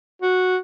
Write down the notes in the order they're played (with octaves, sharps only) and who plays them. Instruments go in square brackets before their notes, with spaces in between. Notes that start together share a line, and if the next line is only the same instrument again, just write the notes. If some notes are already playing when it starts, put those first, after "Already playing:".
[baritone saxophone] F#4